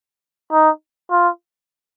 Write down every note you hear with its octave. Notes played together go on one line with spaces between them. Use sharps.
D#4
F4